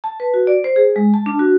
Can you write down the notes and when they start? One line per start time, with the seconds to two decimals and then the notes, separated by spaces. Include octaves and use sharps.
0.04 A5
0.20 B4
0.34 F#4
0.47 D5
0.64 C5
0.76 G#4
0.96 G#3
1.14 A5
1.26 D4
1.39 F#4